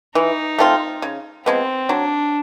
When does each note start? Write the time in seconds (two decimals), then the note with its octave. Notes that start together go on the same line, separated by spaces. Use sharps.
0.15 E3 D#4
0.58 A3 C4 F4
1.02 C#3
1.46 F3 G#3 B3 C4
1.89 F#3 D4